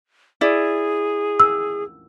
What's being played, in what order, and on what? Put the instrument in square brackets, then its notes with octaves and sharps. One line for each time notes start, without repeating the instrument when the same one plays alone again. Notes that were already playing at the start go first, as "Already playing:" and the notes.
[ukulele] E4 D5 [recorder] G#4
[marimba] E6